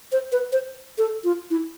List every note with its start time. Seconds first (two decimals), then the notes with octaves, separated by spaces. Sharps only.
0.12 C5
0.32 B4
0.52 C5
0.98 A4
1.24 F4
1.51 E4